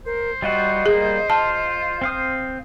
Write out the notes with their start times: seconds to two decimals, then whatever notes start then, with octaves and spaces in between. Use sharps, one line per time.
0.05 A#4 C5
0.42 G3 F4 F#4 D#5
0.86 G3 A#3 G#4
1.30 F4 A5
2.01 C4 F5 D#6